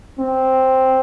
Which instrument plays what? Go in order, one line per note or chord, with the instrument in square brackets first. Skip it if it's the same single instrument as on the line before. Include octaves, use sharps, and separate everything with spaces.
[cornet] C4